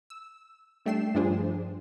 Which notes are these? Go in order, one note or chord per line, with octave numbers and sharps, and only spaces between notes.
E6
G3 A3 D4 G5 C7 E7
G2 F3 D4 G#4 C5